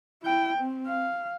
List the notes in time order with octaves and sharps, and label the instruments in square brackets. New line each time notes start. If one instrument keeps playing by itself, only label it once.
[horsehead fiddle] E4 G5
C4
F5